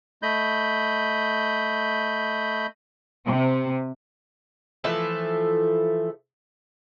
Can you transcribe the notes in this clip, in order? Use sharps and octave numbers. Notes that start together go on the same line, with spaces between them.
A3 D#5 B5 G6
C3
E3 F3 A3 A4